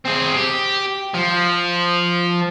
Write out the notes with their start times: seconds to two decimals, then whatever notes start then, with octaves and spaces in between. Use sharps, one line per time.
0.05 C4 G#4
0.36 G4
1.14 F3